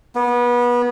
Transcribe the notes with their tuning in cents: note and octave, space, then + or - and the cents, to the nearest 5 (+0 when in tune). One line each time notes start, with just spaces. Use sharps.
B3 -25